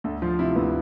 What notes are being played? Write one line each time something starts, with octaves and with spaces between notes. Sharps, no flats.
D2 A4
F3 F4
C3 E4
D2 B3